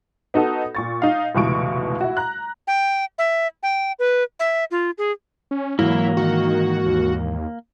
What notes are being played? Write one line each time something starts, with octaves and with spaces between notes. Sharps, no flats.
B3 D#4 F#4 A4
A#2 C#6 A6
D#4 F5
F1 C#2 B2 E3 C#6 D7
E4 F#4
A#5 F#6
G5
E5
G5
B4
E5
F4
G#4
C#4
G#2 E3 F#3 A#3 E4
D#3 F#4
D#2